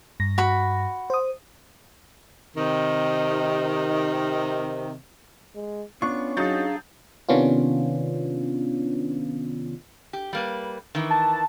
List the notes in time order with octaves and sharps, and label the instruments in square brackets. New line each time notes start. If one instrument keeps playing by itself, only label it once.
[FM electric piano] G2 A#6
[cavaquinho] F#4 B5
[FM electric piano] C5 D#6
[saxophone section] C3 D#3
[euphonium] G#3
[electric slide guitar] B3 D4 F4 [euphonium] C#4 [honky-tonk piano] C#6
[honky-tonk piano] F#3 G6 A6 [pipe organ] D4 G#4 F5 [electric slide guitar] D#4 F#4
[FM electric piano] C3 D#3 B3 C#4 D4 F4
[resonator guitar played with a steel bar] G4
G3 A#3 B4
D#3 E3
[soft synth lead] A5